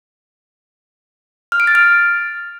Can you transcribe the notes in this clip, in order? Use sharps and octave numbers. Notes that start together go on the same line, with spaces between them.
F6
D7
A6
F6